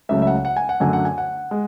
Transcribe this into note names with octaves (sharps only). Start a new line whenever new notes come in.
C#2 C#3 F#3 A3 E5
E5
F#5
F#5
G#5
F#5
F#2 D3 F#3 A3 G#5
F#5
G#5
F#5
G#3